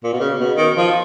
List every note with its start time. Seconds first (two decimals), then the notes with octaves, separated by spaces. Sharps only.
0.04 A#2
0.13 B2
0.20 C#3
0.39 B2
0.57 D#3
0.76 F3